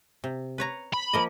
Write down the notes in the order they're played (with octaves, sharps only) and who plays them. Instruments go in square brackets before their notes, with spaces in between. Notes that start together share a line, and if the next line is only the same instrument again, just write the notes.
[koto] C3
B4 C#5 A#5
[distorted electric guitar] B5
[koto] F3 A#3 D#5